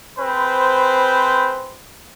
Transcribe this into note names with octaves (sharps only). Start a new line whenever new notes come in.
C4 G#4 B4 C5 B5 C6